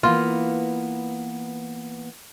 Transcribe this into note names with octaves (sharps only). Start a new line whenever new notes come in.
E3 A#3 B3 F4